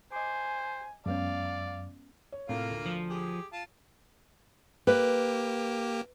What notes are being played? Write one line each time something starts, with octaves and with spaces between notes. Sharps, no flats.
C5 D#5 G#5 D6
F#2 G#3 B3 C#4 D5 F5
C#5
A2 C3 A#3 F4
D2 D3
F3
G4 G#4
F4 A5
A#3 G4 B4